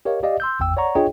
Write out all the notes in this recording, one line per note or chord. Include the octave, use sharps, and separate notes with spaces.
G4 A#4 C#5 D#5 F5
G4 D5 D#5 F5
C6 E6 G6
G#1 E2 G5 E6
C#5 D5 F#5 A#5 C#6
D4 F4 G#4 C#5 D#5 G5